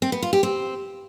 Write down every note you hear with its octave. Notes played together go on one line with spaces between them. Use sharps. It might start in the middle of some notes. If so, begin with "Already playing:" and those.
C4
B3
F4
G4
C4